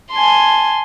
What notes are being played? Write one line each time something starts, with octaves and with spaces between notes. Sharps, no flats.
G#5 A5 C6